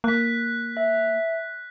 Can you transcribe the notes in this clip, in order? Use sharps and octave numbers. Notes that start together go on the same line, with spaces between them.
A#3 F#6 B6
E5